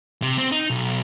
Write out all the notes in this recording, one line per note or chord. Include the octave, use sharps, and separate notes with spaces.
C3
C4
D#4
B1